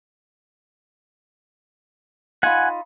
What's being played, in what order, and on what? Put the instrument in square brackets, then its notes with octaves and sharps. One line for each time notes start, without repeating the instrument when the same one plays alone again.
[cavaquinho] D#4 F4 B5 [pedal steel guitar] F#5 G#5